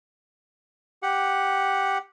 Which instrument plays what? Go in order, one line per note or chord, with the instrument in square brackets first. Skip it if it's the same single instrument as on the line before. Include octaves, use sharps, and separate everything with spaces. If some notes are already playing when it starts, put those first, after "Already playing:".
[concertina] G4 F#5